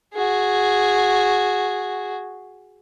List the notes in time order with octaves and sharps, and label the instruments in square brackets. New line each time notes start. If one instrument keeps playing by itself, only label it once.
[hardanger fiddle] F#4 G#4